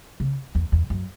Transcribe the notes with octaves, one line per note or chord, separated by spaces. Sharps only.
C#3
E2
E2
F#2